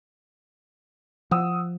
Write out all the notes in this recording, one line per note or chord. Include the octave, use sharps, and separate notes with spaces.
F3 F#5 D#6 E6